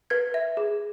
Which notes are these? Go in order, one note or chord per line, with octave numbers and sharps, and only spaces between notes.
B4 G#6
E5
G#4